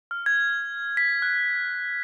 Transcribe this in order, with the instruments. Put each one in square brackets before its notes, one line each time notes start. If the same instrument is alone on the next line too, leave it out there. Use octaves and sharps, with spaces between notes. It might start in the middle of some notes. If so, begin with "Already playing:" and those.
[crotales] F6
G#6
B6
F#6